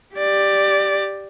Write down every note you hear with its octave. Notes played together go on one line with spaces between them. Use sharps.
G4 D5